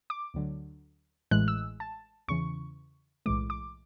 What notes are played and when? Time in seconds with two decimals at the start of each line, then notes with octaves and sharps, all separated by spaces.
0.10 D6
0.34 D2 D3 F#3
1.31 A1 A2 E3 G#3 F#6
1.48 E6
1.80 A5
2.28 E2 C#3 E3 C#6
3.26 B1 A2 E3 G#3 D6
3.50 D6